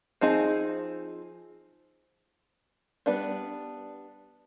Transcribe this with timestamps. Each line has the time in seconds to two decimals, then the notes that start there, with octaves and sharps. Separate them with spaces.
0.21 F3 C4 D#4 G#4
3.06 G3 B3 D4